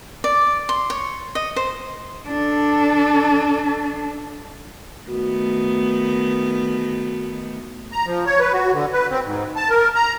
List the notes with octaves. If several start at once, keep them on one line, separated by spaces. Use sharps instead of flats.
D5
C6
C#5
D#5
C5
D4 A4
D#3 A3 B3 F#4
A#5
F3
C#5
B4
F#4
D3
B4
C4
G#2
A5
A#4
A#5